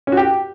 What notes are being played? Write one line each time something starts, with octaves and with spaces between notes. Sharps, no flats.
C#4
F#4
G4